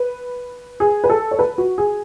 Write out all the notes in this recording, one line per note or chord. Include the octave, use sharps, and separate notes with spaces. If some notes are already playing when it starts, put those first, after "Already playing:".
Already playing: B4
G#4
B4
A4
C#5
B4
F#4
G#4